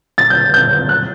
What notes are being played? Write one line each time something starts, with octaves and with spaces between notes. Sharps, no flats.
A6
G6
G6
F#6